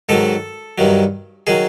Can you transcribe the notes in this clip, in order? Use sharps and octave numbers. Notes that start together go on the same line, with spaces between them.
G#2 D#3 F#3 A4
G2 D#3 F#3
D#3 F#3 G#4